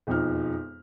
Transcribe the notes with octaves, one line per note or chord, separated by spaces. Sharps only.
E1 F2 F3 D#4 F6